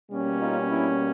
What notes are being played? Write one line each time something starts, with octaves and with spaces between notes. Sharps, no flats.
B2 G3 A#3 C#4
D#4 F4
D4 E4